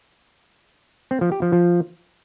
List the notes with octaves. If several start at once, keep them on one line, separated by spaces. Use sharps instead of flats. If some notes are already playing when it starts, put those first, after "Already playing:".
C4
F3
G4
F3
F3